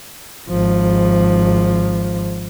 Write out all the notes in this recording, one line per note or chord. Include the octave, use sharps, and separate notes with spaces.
G#1 F3